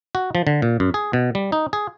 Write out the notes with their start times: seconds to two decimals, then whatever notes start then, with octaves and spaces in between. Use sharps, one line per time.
0.15 F#4
0.35 F3
0.47 D3
0.62 A#2
0.80 F#2
0.94 G#4
1.13 B2
1.35 G3
1.52 D#4
1.73 G#4